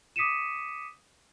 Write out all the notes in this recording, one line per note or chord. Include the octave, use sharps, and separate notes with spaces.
D6 D#6 B6 C#7 D#7 E7